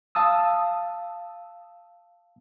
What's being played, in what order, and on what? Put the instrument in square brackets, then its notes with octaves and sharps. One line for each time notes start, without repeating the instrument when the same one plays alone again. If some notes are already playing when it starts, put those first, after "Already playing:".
[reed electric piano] F5 A5 D#6 E6